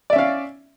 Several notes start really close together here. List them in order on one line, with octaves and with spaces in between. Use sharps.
D5 E5 C#4 F5